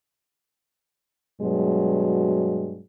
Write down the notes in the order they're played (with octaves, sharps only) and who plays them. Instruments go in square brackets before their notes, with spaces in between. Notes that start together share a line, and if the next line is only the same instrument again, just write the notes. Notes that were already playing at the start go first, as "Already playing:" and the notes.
[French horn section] G2 B2 F#3 G#3